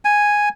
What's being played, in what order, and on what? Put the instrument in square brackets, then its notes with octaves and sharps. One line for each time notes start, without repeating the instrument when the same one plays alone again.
[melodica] G#5